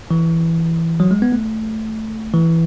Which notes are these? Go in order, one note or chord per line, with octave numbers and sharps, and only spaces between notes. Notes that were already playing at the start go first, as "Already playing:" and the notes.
E3
F#3
G#3
B3
A3
E3